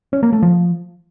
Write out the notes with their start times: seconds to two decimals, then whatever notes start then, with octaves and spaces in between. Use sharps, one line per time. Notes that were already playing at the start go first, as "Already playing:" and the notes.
0.13 C#4
0.23 A#3
0.33 A3
0.42 F3